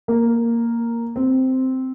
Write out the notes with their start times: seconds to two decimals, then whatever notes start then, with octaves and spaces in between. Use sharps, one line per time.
0.08 A#3
1.16 C4